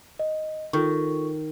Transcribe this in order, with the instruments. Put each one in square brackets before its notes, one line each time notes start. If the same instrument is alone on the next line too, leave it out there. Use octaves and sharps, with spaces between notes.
[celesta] D#5
[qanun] D#3 [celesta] F4 A4 C#6